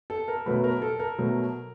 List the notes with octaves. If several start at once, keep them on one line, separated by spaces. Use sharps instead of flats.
A4
A#4
B2 F#3 A3 B4
A#4
A4
A#4
B2 F#3 A3